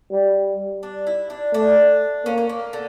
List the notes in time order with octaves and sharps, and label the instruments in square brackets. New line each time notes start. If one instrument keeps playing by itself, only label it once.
[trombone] G3
[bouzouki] D4
E4
D4
[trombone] A3 [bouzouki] D4
[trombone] A#3 [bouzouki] C#4
[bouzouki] C#4
A#3
D3